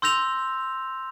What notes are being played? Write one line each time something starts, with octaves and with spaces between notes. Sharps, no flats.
C6 E6 G6 A#6 F7